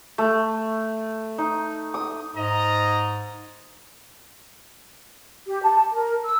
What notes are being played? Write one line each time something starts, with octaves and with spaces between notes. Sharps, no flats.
A3
D#4
D#6
G#2 D#5 A#5
G4
A5
A#4
E6